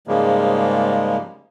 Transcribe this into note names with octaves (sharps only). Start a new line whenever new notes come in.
G#2 C#3 F3 G3 G#3 A#3